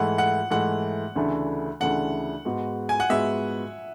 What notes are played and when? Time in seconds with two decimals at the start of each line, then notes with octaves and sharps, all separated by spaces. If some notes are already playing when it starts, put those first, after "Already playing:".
Already playing: G#2 E3 A3 F#5
0.18 F#5
0.51 G#2 E3 A3 F#5
1.15 D2 C#3 E3 A3 D4
1.80 D2 C#3 E3 A3 D4 F#5
2.45 G#2 G#3 B3 F#4
2.89 G#5
3.00 F#5
3.10 G#2 G#3 B3 F#4 E5